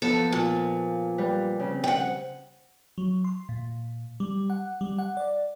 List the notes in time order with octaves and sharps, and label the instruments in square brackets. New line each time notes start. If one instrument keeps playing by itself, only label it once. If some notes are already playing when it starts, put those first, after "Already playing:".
[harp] F3 B3 [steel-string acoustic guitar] A4
[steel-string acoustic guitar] A#2
[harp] G3 B4
C#3 C4
[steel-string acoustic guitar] F#5 G5
[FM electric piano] F#3
C6
A#2
G3
F#5
G3
F#5
D5